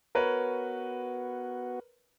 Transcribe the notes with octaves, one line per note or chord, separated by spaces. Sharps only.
B3 F#4 A#4 B4 C#5